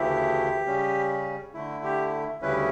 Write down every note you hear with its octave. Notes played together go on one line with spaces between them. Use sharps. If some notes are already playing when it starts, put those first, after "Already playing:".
Already playing: D2 C#3 E3 A3 E4 G4
C#3 G3 C#4
D3 A3 E4
G4
D2 C#3 G3 C#4 E4 B4